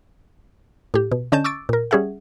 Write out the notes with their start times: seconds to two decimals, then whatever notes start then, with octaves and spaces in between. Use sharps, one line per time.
0.94 A2 G4
1.12 B2
1.32 D3 C#4 D#5 A5 G6 E7
1.44 C#6 D6 E6 A6 D7
1.69 A#2 A#4
1.91 G3 C#4 G#4 E5 F#5